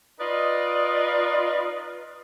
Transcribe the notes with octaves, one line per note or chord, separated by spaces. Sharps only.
D#4 F4 B4 D5 D#5